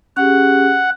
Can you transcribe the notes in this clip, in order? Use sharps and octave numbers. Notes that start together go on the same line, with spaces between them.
C#4 G4 G#4 F#5